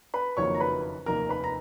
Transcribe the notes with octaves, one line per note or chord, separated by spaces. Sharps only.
B4 B5
F#1 F2 D#3 F#3 A#3 C#5 C#6
A#5
B4 B5
F1 D#2 D#3 A#3 A#4 A#5
B4 B5
A#5